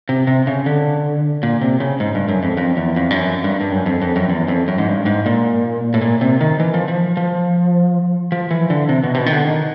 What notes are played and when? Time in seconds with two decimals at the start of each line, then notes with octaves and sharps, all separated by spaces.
0.09 C3
0.27 C3
0.47 C#3
0.66 D3
1.43 A#2
1.61 C3
1.80 C#3
2.00 G#2
2.15 G2
2.29 F#2
2.43 F2
2.57 F2
2.77 E2
2.96 F2
3.10 G2
3.14 F#2
3.44 G2
3.61 G2
3.72 F#2
3.86 F2
4.02 F2
4.16 F#2
4.30 E2
4.48 F2
4.68 F#2
4.78 G#2
4.88 G2
5.06 G#2
5.26 A#2
5.94 A2
6.02 A#2
6.21 C3
6.41 D#3
6.60 E3
6.74 F3
6.88 F3
7.17 F3
8.32 F3
8.51 E3
8.70 D3
8.89 C3
9.03 B2
9.14 C3
9.18 B2
9.26 D#3
9.32 D3
9.47 D#3